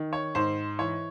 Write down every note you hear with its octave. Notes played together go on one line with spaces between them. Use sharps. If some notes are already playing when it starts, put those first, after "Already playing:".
Already playing: D#3
C#5
G#2 C5
E3 C#5